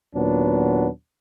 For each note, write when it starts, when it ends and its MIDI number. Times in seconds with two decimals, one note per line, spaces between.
0.14 0.88 39
0.14 0.88 46
0.14 0.88 54
0.14 0.88 59
0.14 0.88 62